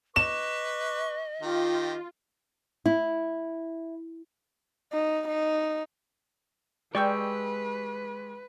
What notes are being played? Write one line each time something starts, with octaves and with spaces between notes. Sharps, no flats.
B4 D#5 C#6 D6 E7
D#3 F4 G4
E4
D#4
D#4
G#3 G4 B4 D5 G5 C#6 E6